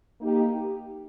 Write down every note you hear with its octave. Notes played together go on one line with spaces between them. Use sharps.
A#3 D#4 G4